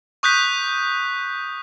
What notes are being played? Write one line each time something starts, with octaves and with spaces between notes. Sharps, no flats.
C#6 D#6 F#6 G6 B6